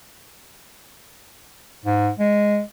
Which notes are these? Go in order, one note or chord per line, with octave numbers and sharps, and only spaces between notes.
G#2
G#3